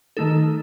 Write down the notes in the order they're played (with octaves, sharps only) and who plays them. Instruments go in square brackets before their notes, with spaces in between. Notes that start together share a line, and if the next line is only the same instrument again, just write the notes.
[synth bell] D#3 A3 D#4 A4